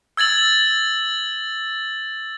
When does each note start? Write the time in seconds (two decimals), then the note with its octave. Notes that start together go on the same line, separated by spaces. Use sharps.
0.17 E6 G#6 A6 F#7